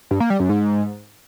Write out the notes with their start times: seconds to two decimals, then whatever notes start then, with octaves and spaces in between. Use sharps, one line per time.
0.11 G2
0.20 A#3
0.30 G3
0.40 F#2
0.49 G#2